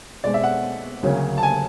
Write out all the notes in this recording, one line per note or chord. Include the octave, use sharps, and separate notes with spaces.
B2 G#3 C4 D5
E5
F#5
D2 C#3 F#3 A#3 C#4
A5
G#5